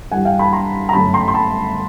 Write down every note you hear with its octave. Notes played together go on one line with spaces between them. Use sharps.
G2 E3 G3 F#5 G#5
F5 G5
A5 B5
A#5 C6
A#5
G1 F#2 C#3 F#3 A3 A5 B5
A#5 C6
C6
A5 B5